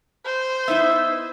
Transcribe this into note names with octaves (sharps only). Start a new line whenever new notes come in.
C5
B3 D#4 E4 E5